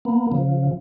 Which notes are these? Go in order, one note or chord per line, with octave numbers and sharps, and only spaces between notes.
A#3 B3
C#3 F3